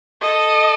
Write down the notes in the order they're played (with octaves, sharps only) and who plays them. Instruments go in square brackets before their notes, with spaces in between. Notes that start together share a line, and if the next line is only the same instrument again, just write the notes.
[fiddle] A4 [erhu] D#5